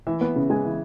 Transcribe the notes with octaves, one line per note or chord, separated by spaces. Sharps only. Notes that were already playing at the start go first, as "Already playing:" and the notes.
E3 E5
B3
C#3
G#3 G#5
E3